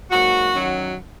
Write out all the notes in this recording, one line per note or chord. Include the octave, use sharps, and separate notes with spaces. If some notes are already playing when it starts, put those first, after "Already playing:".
G#2 F#3 A#3 F#4
F#2 D#3 F#3